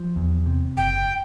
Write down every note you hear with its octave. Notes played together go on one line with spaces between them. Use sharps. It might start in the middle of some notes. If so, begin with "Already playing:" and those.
Already playing: F3
E2
C3
F#1 G5